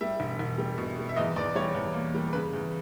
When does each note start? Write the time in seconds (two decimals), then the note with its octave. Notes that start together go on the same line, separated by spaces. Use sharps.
0.01 G3 E5
0.20 E1
0.39 E1
0.58 G3
0.78 B2
0.98 G3
1.09 E5
1.16 E2 D#5
1.36 E2 D5
1.55 G3 C#5
1.75 E2
1.94 A#3
2.15 G3
2.33 C#3 B4
2.53 E2